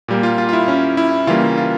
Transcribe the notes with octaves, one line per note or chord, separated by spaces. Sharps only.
A#2 G3 A#3
F4
F4
F4
E4
C#4
E4
C#3 E3 G3 A#3 F4
F4